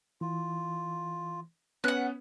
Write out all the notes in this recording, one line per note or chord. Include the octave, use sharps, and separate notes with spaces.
E3 F4
B3 C#4 B4 F#5 F#6